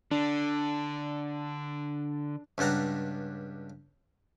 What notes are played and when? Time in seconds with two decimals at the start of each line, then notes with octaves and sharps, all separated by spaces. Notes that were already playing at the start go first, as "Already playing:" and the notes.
0.11 D3 D4
2.58 C#2 G2 D4 F#5 A#5